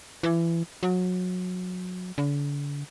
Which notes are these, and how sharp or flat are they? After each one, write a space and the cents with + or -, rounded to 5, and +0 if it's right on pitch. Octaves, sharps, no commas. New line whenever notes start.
E3 +25
F#3 -25
D3 -40